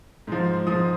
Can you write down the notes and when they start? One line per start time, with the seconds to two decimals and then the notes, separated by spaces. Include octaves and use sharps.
0.27 G#2 F3
0.67 G#2 F3 D#6